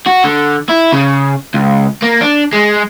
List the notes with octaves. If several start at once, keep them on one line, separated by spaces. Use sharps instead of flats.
F#4
D3
E4
C#3
C#2
A#3
D4
G#3